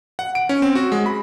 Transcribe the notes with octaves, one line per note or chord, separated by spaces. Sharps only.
F#5
D7
C#4
C4
F#4
G#3
B5